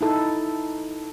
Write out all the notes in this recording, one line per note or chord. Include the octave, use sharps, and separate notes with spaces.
D#4 E4 A4